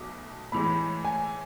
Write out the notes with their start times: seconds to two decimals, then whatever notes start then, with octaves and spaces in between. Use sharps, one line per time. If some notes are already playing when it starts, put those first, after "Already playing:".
Already playing: B1 B2 A3 D6
0.52 A2 E3 G#3 B5
1.05 G#5